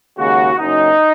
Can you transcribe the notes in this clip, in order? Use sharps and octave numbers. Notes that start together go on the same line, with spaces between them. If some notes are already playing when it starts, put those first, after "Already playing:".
D#2 C#3 G#3 F#4
F#1 F#2 F#3 D#4